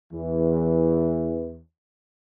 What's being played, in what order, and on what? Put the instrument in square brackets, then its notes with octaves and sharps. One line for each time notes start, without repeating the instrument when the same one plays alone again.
[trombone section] E2 E3